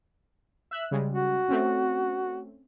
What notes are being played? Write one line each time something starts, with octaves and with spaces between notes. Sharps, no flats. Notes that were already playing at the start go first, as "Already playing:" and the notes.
E5 E6 F#6
C#3 G3 G#3
F#4
A3 C4 C#4